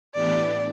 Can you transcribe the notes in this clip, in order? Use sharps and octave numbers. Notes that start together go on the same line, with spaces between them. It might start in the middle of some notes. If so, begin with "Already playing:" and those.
A2 E3 B3 D4 G4 D5